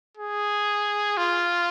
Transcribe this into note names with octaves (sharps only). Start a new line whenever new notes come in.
G#4
F4